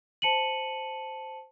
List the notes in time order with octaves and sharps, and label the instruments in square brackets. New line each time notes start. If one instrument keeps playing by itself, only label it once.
[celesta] C5 A5 C#7 D#7 F#7